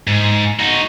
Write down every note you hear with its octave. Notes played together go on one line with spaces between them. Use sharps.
G#2
D#4 F#4